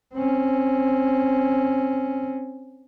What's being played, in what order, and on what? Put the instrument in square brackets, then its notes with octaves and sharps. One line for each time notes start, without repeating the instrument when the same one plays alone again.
[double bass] C4 C#4